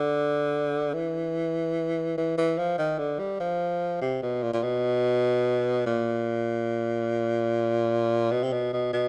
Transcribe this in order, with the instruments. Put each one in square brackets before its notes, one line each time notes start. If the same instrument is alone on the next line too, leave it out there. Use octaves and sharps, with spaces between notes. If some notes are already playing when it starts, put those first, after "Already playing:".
Already playing: [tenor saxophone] D3
E3
E3
E3
F3
D#3
D3
G3
F3
C3
B2
A#2
A#2
B2
A#2
B2
C3
B2
B2
B2